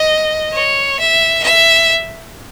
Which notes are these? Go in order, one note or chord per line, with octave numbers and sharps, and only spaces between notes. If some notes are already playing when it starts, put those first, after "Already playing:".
Already playing: D#5
C#5
E5
E5